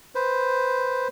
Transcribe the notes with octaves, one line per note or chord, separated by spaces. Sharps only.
B4 C5